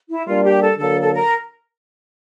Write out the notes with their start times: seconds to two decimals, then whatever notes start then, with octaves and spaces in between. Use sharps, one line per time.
0.09 E4
0.26 G3 A#3 D4 F4
0.44 G4
0.61 A4
0.78 D3 F#3 A#3 A4
1.02 A4
1.14 A#4